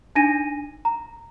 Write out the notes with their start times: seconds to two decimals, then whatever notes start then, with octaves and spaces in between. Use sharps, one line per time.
0.15 D4 D#4 G#5 A#6 D#7
0.85 A#5